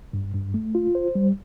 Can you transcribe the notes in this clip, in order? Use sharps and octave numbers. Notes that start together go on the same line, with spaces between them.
G2
G2
A3
F4
C5
G3